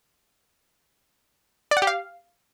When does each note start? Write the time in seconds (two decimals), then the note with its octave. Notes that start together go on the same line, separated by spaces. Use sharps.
1.71 D5
1.77 F#5
1.82 G4
1.87 F5